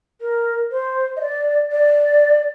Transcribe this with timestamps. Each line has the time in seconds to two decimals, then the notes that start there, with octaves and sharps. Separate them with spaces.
0.21 A#4
0.71 C5
1.17 D#5
1.21 D5
1.71 D5